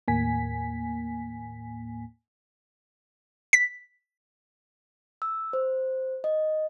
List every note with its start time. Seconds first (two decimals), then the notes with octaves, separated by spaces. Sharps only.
0.08 D#2 A2 A#3 G#5 B6
3.53 B6
5.22 E6
5.53 C5
6.24 D#5